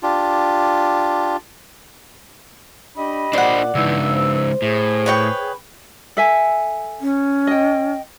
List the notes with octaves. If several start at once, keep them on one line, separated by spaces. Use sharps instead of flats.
D4 F4 G4
D4 G4 D#5 B5
A#2 D4 C5 D5 F#5
G2 C#3 E3 G#3 D#4 E6
C5
A2 G#4
B4 C#5 G5
A4 E5 G#5
C#4
D#5 G5